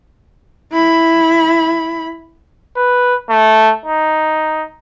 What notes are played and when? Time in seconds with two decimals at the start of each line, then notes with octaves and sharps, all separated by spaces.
0.72 E4 B5
2.76 B4
3.29 A3
3.85 D#4